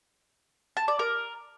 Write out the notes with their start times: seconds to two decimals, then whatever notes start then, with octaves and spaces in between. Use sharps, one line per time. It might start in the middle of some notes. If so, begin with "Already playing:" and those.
0.77 A5
0.88 D5
0.99 A#4